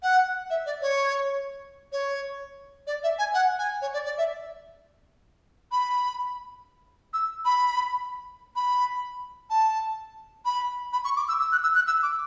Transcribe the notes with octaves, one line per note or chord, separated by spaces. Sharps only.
F#5
E5
D5
C#5
C#5
D5
E5
G#5
F#5
G#5
C#5
D5
D5
E5
B5
E6
B5
B5
A5
B5
B5
C#6
D6
E6
E6
F#6
E6
F#6
E6
D6